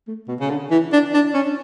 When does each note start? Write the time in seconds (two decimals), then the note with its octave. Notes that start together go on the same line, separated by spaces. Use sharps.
0.07 A3
0.28 B2
0.40 C#3
0.50 D3
0.71 E3
0.92 D4
1.14 D4
1.34 C#4